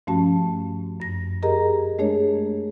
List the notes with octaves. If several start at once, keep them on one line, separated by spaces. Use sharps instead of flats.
G2 F3 A3 C#4 F#4 A5
F#2 A#6
G4 G#4 A#4 D#5 A#5
G#3 A3 D4 G#4 C#5